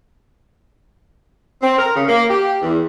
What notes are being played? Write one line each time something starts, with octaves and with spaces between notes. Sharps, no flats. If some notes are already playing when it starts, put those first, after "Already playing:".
C4
A#4
C#3
A#3
G4
E2